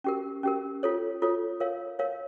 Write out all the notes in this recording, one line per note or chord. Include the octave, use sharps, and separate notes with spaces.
C#4 G4 A#4
C#4 G4 A#4
F4 A4 C#5
F4 A4 C#5
A#4 C#5 F5
A#4 C#5 F5